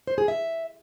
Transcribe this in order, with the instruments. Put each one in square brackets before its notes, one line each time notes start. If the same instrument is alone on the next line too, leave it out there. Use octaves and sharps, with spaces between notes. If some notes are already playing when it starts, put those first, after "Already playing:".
[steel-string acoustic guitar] C5
G#4
E5